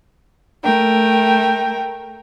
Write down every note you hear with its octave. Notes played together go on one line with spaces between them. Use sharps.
A3 A#4 G5